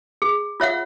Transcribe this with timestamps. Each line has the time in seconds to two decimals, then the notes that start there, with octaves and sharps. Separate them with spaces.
0.22 G#4
0.60 F4 C#5 E5 F#5